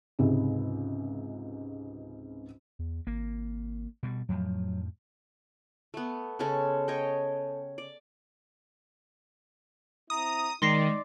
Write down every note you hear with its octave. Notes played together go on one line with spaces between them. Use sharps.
C#2 G#2 C3
E2
G#1 A#3
B2 G3
F2 A2 F3 F#3
A3 B3
C#3 G#3 C#4 A4
C#5 D#5 G5
D5
C4 E4 A#5 D#6
D#3 G#3 D#4 D5 C6 A#6 C7